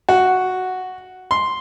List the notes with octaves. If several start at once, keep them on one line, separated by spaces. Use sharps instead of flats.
F#4
C6